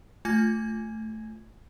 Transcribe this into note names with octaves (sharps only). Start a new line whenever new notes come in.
A3 F4 G#5 G#6